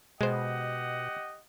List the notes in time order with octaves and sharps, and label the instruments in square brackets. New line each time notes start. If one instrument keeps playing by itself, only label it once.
[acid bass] B2 [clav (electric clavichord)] G#3 C5 [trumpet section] G4 D#5 F#5